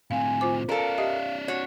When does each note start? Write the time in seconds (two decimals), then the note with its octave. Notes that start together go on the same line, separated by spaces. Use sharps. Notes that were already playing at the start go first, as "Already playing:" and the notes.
0.11 A2 C4 F5 G#5
0.41 F4 C5 D6
0.69 C#4 A4 A#4 D5 F5
0.98 G4 D#5 E5
1.48 F#4 C#5